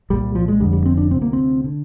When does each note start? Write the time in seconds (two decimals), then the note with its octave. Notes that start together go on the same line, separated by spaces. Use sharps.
0.10 C2 A#2 G3
0.35 F3
0.48 G#3
0.60 F1 F2 D3 G3
0.73 G3
0.86 C4
0.97 D4
1.10 D2 C3 C4
1.22 A#3
1.33 C4
1.64 D3